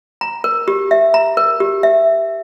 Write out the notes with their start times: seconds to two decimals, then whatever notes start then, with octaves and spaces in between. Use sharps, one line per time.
0.21 A#5
0.44 A#4
0.68 G4
0.91 E5
1.14 A#5
1.37 A#4
1.60 G4
1.83 E5